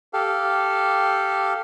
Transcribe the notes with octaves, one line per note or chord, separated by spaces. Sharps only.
G4 A4 F5